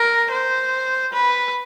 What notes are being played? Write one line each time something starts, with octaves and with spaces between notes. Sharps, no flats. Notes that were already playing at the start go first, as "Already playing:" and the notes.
Already playing: A#4
C5
B4